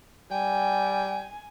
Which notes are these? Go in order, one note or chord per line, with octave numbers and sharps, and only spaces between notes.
G3 G5 G#5